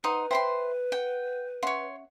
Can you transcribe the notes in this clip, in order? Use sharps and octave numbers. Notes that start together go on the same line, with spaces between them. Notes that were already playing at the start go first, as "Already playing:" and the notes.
D#4 B4 C5 F#5 C6 D#6
C5 E5 G5 B5 C6
F#5 G5
C#4 C#5 E5 F#5 C6